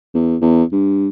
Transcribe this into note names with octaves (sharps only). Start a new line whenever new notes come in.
E2
E2
G2